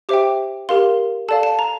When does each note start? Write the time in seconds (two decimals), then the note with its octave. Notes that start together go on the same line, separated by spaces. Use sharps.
0.09 G4 C5 E5 G5 D6
0.69 G4 A#4 F5 C6
1.28 A4 D5 F5 A5
1.43 A5
1.59 A#5